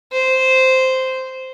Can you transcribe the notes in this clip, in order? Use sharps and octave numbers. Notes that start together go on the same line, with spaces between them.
C5